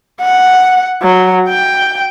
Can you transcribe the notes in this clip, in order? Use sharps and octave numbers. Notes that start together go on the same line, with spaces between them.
F#5
F#3
G5